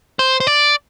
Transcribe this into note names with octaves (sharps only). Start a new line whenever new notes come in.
C5
C5
D5